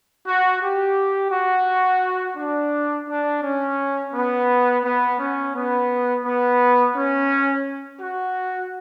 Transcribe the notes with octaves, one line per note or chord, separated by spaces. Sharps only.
F#4
G4
F#4
D4
D4
C#4
B3
B3
C#4
B3
B3
C#4
F#4